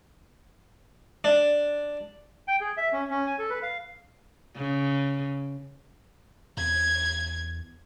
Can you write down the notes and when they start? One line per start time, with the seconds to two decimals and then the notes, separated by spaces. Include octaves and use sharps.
1.24 D4
2.48 G5
2.61 G#4
2.77 E5
2.93 C#4
3.10 C#4
3.27 G#5
3.39 A4
3.50 B4
3.63 F5
4.56 C#3
6.57 E2 G#6